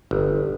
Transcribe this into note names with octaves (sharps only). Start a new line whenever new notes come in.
G1